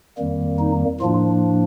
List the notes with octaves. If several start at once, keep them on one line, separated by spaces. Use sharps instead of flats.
F2 D#3 G3 A#3
D#4
A2 F3 A#3 D4 F4